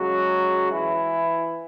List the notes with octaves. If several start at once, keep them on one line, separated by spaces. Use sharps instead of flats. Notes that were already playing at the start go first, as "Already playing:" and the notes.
Already playing: C#3 F#3 G#3 F#4
E3 E4